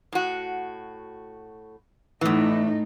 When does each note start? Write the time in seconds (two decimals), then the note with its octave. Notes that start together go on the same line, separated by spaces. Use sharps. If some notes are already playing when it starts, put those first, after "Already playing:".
0.13 A2 F#4
2.21 E2 A2 E3 D#4